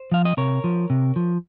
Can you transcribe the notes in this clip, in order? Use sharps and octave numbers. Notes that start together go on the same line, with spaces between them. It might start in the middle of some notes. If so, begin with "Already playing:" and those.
Already playing: C5
F3 F5
D#5
C3 A#4 C#5
F3
C3
F3